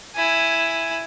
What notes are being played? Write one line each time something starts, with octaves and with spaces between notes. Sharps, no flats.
E4 G#5